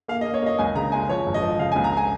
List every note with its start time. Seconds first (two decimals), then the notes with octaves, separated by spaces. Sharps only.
0.08 A#3 F5
0.21 D#5
0.25 A#3
0.34 C#5
0.42 A#3 D#5
0.59 C#2 G#5
0.75 C#3 A#5
0.92 G#3 G#5
1.09 F3 C#5
1.26 G#1
1.34 D#5
1.42 F3
1.59 C#3 F5
1.72 G#5
1.76 C#2
1.84 A#5
1.97 G#5